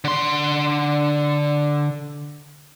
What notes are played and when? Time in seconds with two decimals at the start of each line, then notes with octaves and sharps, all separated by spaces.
0.04 D3 C6